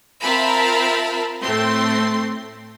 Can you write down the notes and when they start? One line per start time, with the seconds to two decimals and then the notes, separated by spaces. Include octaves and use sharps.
0.22 C4 F4 A#4 E5 A5 B5
1.42 A2 A3 C4 C6